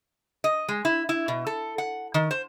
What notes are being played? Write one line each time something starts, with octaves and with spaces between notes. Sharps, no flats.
D#5
G#3
E4
E4
B2
A4
F#5
D#3
C5